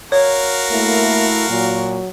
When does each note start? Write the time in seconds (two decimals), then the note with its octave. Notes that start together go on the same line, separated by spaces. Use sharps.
0.12 F#4 A#4 C#5 F5
0.72 A3 A#3 E4
1.49 A#2 F#3